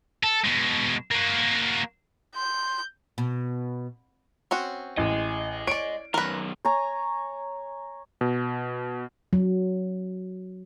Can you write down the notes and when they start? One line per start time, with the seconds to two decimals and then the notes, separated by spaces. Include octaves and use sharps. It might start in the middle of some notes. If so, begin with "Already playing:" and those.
0.23 A4
0.44 B2 G#3
1.11 A#3 F#4
2.35 C6 G6
3.18 B2
4.51 C4 C#4 F#4
4.97 A1 D#5 G#5
5.67 C#5 D5 D7
6.14 F#2 D#3 A#4 B4
6.65 C#5 G#5 A#5
8.21 B2
9.33 F#3